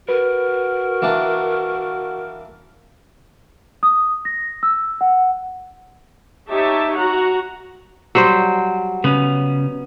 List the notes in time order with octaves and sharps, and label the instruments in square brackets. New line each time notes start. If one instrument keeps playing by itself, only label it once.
[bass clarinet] F#4 [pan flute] A#4 [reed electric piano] B4
[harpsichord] E3 A#3 D4
[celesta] D#6
A#6
E6
F#5
[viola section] D#4 G4 C#5 E5 A5
F#4 F#5 A#5
[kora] F#3 G3 C5
[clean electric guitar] C#3 C#4 [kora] B3